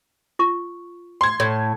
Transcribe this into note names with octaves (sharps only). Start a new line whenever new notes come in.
F4 C#6
C6 G#6
A2